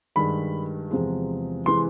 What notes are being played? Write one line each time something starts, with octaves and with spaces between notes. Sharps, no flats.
G2 D#3 G#3 B5
E2 C3 F3 G#3
C3 E3 G#3 C6